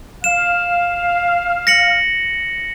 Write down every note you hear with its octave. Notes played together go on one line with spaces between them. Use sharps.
F5 E7
A#6 C#7 F#7